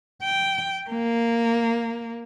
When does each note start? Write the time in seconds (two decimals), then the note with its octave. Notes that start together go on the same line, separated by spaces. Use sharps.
0.23 G5
0.90 A#3